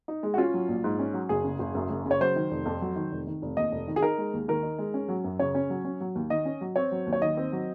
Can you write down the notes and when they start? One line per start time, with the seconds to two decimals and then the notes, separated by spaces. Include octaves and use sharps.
0.08 D#4
0.23 G#3
0.34 F#4
0.38 C#4 F4
0.54 F#3
0.68 A#1
0.84 G#2
0.99 C#4
1.14 F#3
1.29 F#1 G#4
1.44 C#3
1.59 F#1
1.75 F#2
1.90 F#1
2.06 C#3
2.11 C#5
2.21 F#3 C5
2.36 D#3
2.51 F1
2.66 F2
2.81 F#3
2.96 D#3
3.12 F1
3.27 D#3
3.42 F1
3.57 D#2 D#5
3.72 F1
3.88 D#3
3.96 G#4
4.02 D#4 A#4
4.18 G#3
4.33 D#2
4.48 D#3 A#4
4.63 D#4
4.78 G#3
4.94 C#4
5.08 F#3
5.24 F#2
5.39 C#3 C#5
5.55 C#4
5.70 F#3
5.85 C#4
6.01 F#3
6.15 D#2
6.30 D#3 D#5
6.45 C#4
6.61 F#3
6.76 C4 C#5
6.92 F#3
7.07 D#2
7.13 C#5
7.21 D#3 D#5
7.37 C4
7.52 F#3